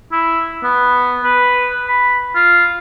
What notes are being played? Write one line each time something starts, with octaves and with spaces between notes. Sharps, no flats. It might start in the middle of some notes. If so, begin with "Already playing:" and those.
E4
B3
B4
B5
F4